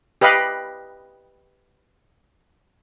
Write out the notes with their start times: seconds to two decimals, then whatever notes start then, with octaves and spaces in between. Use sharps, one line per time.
0.21 G4 B4 D#5 F5 B5